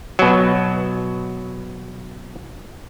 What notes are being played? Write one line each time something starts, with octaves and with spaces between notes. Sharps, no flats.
B2 F#3